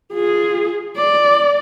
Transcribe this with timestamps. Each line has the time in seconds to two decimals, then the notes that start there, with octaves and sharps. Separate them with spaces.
0.13 F4 G#4
0.97 D5